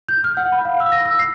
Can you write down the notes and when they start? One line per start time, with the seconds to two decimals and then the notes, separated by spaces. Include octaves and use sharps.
0.09 G6
0.24 F6
0.37 F#5
0.52 B5
0.65 F5
0.80 E6
0.92 A#6
1.05 E6
1.19 C7